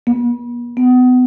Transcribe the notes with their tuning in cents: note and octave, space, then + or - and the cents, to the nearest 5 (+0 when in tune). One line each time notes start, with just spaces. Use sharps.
B3 -45
B3 +30